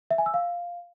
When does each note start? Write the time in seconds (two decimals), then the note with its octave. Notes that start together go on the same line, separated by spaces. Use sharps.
0.11 E5
0.18 G#5
0.26 E6
0.34 F5